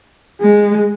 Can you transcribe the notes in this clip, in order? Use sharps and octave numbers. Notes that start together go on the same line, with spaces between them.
G#3